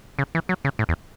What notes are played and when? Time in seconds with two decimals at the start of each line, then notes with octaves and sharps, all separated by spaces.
0.19 C#3
0.35 E3
0.49 F#3
0.65 C#3
0.79 A2
0.89 E2